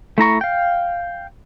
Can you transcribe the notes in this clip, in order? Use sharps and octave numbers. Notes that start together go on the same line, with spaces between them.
A3 E4 A#5 C#6
F5 G5